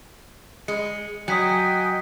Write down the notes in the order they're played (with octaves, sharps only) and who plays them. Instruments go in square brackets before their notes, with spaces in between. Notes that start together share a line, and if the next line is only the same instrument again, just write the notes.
[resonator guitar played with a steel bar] G#3 [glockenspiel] C#7
[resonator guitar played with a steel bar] F#3 [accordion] D#5 G5 G#5 [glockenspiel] D#6 B6 C#7